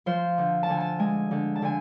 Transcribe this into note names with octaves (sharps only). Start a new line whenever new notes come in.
F3 C5
D3
A5
D3 G#5
A5
G#3 G#5
D3
A5
D3 G#5